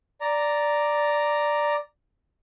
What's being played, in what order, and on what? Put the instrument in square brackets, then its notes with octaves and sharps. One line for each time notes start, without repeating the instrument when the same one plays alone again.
[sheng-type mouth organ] D5 A#5